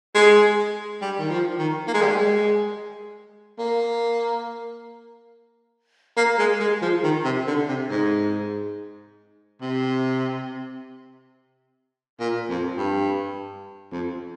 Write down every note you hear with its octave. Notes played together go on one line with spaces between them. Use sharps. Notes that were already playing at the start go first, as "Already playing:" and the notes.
G#3
G3
D#3
F3
D#3
A#3
G#3
G3
G#3
A#3
A#3
G#3
G#3
F3
D#3
C3
D3
C3
G#2
C3
A#2
F2
G2
F2